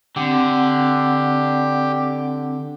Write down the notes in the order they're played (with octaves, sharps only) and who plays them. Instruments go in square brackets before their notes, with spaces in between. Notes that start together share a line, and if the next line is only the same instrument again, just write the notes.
[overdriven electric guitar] D3 [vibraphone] C4 F#5 [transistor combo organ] G4